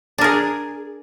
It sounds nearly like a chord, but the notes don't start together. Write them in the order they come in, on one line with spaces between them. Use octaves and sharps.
D4 A#4 G#4